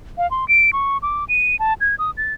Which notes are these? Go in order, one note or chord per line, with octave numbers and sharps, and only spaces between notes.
F5
C6
D7
C#6
D6
D#7
A5
G#6
D#6
A6